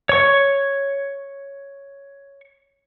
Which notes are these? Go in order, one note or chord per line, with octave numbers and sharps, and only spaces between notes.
C#5 C#6